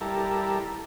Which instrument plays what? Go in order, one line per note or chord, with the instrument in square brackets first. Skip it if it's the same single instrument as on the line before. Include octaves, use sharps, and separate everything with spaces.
[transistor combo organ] G3 E4 A4 A#4